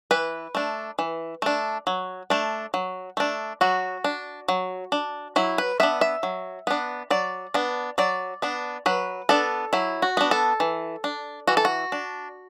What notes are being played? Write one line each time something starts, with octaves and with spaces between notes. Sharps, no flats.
E3 B4
A3 D4
E3
A3 D4
F#3
A3 D4
F#3
A3 D4
F#3 F#4
D4
F#3
D4
F#3 E4
B4
B3 D4 E5
E5
F#3
B3 D4
F#3 D5
B3 D4
F#3 D5
B3 D4
F#3 B4
B3 D4 A4
F#3 E4
F#4
B3 D4
A4
E3
D4
E3 F#4
A4
F#4
D4